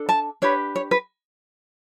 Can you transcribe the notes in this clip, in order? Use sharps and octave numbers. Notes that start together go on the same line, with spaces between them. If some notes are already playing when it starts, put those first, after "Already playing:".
Already playing: D4 A4
A5
D4 G4 B4 C#5
C#5
B4